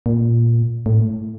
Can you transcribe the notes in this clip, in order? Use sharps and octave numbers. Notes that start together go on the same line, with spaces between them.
A#2
A2